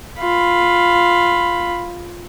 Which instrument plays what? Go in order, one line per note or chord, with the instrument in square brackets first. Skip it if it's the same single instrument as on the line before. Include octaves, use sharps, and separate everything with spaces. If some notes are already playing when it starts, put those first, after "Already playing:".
[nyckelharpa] F4 B5